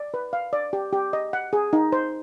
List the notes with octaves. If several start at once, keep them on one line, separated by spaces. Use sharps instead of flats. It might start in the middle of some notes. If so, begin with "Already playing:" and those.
Already playing: D5
B4
F5
D5
G4
G4
D#5
F#5
G#4
D#4
C5